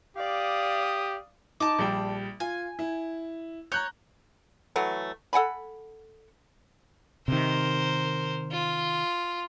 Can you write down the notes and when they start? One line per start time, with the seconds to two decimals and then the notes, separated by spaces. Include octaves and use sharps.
0.17 G4 D5 F5 D#6
1.60 D#4 A5 D6
1.78 A#1 G3 G5
2.40 F4 G#5
2.79 E4
3.72 C#5 A#5 F#6 G6
4.76 E3 F#3 A3
5.33 A4 F#5 G#5 B5
7.28 C3 D#3 A#4 C5
8.52 F4